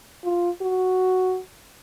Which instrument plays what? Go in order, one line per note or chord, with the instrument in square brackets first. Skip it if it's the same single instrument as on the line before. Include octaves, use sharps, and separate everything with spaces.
[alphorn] F4
F#4